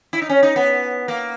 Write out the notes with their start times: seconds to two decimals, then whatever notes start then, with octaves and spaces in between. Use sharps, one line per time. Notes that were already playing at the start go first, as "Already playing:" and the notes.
0.13 E4
0.22 D#4
0.29 C#4
0.43 D#4
0.56 B3
1.08 A#3